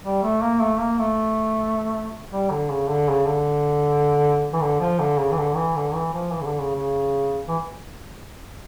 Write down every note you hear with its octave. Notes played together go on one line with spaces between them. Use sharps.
G3
A3
A#3
A3
A#3
A3
G3
D3
C#3
D3
C#3
D3
E3
D3
F3
D3
C#3
E3
D3
E3
D3
E3
F3
E3
C#3
D3
C#3
C#3
E3